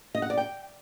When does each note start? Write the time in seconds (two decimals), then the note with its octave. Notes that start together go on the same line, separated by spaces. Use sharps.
0.15 D#5
0.22 F#5
0.30 D5
0.37 G5